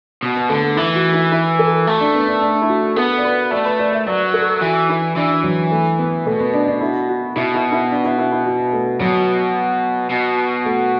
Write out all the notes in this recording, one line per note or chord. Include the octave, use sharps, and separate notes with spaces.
B2
B3
D3 A3
A3
E3 E4
F#4
E4
E4
A4
A3
D4
B3
D4
D4
E4
F#4
B3 A4
D5
B4
A3 D5
B4
D5
E5
F#3 D5
A4
E3 F#4
E4
E3 D4
F#3
A3
B3
B2 A3
B3
D4
D4
E4
F#4
B2 E4
E4
E4
D4
E4
E4
E4
F#4
A3
B2 F#3
B2
A3